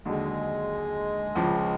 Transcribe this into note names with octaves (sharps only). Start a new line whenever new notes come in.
D#2 D3 F#3 G#3
C#2 C#3 F3